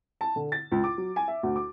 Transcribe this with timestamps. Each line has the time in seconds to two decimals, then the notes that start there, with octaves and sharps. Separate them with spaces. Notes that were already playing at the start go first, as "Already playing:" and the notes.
0.21 A5
0.36 D3
0.52 A6
0.71 C#2
0.84 D6
0.98 F#3
1.16 G#5
1.28 E5
1.43 D2
1.56 D6